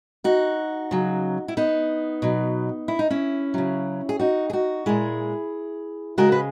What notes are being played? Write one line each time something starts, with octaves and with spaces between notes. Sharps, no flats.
D#4 F#4
C#3 F#3
E4
B3 D#4
B2 F#3
E4
D#4
C#4 E4
C#3 F#3
G#4
D#4 F#4
G#4
D#4 F#4
A#2 G#3 E4 G#4
C#3 G#3 F#4 A#4
B4